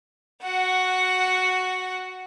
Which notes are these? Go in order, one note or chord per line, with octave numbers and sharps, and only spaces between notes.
F#4 F#5